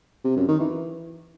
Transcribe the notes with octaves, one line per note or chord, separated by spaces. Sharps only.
C3
F#2
D#3
E3